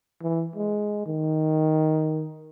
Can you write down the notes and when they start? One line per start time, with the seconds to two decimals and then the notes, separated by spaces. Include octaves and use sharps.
0.22 E3
0.56 G#3
1.06 D#3